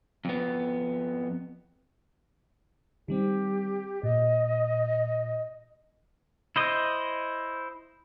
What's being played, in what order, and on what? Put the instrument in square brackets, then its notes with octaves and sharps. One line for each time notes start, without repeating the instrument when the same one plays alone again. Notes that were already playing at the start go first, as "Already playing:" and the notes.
[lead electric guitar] F2 B3
[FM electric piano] D#3 G3 C4 [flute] G4
[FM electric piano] A#2 [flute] D#5
[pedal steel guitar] E4 C5 D#5